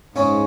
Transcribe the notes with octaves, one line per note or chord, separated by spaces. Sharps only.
G#2 C#3 C#4